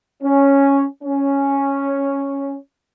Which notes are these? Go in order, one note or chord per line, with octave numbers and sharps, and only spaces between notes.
C#4
C#4